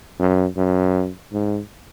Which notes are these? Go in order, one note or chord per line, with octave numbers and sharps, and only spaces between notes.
F#2
F#2
G#2